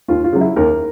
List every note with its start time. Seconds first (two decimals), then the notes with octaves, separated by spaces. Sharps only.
0.08 D#2 F4
0.24 F4
0.33 C#3 F#3
0.41 E4
0.56 D#2 A#4